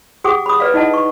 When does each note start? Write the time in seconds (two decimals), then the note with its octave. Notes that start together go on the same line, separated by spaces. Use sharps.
0.24 G4 G#4 F#5 G5 D6 D#6
0.46 B5 D#6
0.60 B4 D5 E5 F5
0.74 D#4 E4 D#5 F#5 A5
0.94 C#6